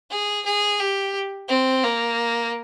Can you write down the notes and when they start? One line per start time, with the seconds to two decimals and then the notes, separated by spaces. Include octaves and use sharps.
0.11 G#4
0.46 G#4
0.80 G4
1.49 C4
1.83 A#3